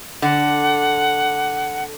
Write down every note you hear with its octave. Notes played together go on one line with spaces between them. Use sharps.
D3 F#5